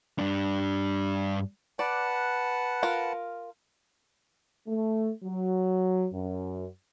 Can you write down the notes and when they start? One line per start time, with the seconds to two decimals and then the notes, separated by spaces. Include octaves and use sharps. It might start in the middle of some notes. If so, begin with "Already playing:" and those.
0.19 G2 D4
1.79 B4 D5 F#5 A5
2.83 F4 A#4
4.68 A3
5.23 F#3
6.13 F#2